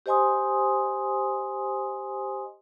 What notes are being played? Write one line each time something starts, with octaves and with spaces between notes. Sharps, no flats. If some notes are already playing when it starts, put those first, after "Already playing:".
G4 C5 D#5 G#5 C6 D#6